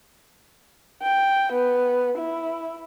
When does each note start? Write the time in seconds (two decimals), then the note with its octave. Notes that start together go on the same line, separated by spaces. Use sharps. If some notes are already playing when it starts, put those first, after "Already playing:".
1.03 G5
1.52 B3
2.18 E4